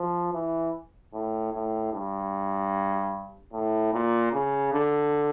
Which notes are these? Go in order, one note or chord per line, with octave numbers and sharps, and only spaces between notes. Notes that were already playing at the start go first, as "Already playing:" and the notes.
Already playing: F3
E3
A2
A2
G2
A2
A#2
C#3
D3